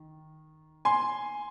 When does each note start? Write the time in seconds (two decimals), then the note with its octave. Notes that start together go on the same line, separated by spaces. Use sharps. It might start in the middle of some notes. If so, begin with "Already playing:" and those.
Already playing: D#3
0.85 G#5 C6